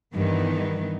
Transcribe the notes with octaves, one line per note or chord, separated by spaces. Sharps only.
G2 D#3 E3 B3